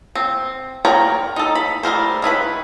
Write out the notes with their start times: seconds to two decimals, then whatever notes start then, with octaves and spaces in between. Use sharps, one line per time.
0.15 C4
0.85 A#4 C#5 D5 G5 A#5
1.36 D#4 A4
1.55 B5
1.83 G3 A3 A#4 C5
2.22 D#3 E4 B4 B5